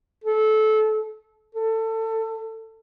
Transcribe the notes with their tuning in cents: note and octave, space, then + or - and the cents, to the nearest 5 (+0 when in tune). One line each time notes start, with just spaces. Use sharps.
A4 -25
A4 +25